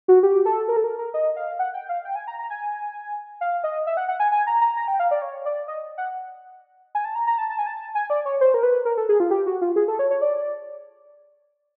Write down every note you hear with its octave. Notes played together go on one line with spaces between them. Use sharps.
F#4
G4
A4
A#4
A4
A#4
A#4
D#5
F5
F#5
G5
F5
G5
G#5
A#5
A#5
G#5
F5
D#5
E5
F#5
F#5
G#5
G#5
A#5
A#5
A#5
G5
F5
D5
C#5
D5
D#5
F#5
G#5
A5
A#5
A#5
A5
A5
G#5
A5
G#5
D5
C#5
C5
A#4
B4
A#4
A4
G#4
F4
G4
F#4
F4
G#4
A4
C#5
C#5
D5